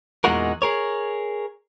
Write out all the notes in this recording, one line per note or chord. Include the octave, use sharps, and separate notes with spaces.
E2 A#2 G#3 D#4 F#4 A#4
G#4 A#4 C#5